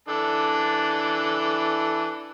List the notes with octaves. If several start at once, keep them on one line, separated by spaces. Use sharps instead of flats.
E3 D4 A4